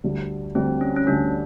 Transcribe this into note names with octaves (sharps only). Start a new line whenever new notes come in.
D2 D3 G3
D2 D3 G3 C4
C#4
C#4
D2 D3 G3 D4